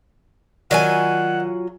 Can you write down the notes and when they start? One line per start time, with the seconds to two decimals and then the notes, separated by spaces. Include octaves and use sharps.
0.71 D#3 F#3 F4 D5 F#5 G#5